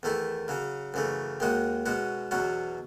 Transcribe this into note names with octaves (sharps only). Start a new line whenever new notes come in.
E2 D#3 A3 E4
C#3 F#3 C#4
F#2 C#3 E3 A3
D#2 D#3 G#3 D#4 F#4
B2 G#3 C#4 F#4
E2 B2 F#3 C#4 F#4